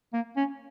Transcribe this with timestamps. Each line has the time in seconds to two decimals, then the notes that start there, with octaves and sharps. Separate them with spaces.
0.13 A#3
0.36 C#4